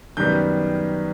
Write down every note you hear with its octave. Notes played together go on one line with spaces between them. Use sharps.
F#2 D#3 G3 B3 G6